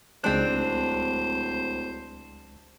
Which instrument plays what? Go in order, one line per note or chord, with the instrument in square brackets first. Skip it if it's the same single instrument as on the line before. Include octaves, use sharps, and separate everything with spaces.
[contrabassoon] D1 [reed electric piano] C#2 G#3 F#6 [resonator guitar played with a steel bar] C4 D4 [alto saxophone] C5